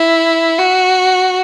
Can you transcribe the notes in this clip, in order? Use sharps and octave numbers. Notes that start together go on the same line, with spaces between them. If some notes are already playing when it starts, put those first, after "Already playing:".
Already playing: E4
F#4